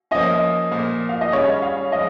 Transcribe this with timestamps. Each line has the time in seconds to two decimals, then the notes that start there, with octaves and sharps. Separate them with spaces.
0.11 F3 A#3 C#4 D#5
0.71 A#2 F3 A#3
1.09 F5
1.21 D#5
1.33 C#3 G3 C#4 C#5
1.62 F5
1.92 F3 G#3 D#5